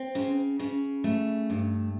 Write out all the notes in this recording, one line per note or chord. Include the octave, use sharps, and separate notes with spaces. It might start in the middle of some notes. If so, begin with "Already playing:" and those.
Already playing: C4
C#3
C#3
A3
G2